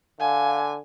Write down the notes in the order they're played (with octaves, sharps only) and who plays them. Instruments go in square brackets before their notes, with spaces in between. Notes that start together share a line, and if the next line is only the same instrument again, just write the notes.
[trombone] D3 [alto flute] F5 [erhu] G#5